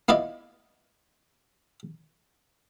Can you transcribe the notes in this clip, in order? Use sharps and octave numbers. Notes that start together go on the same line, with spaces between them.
B3 E4 F4 D5 D#5